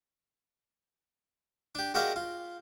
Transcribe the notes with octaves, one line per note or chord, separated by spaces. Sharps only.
D4 G4
G#3 F#4 G4 A#4 D5 F5
F4